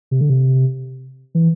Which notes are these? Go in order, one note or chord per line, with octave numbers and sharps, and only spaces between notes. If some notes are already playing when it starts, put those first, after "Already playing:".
C3
D3
C3
E3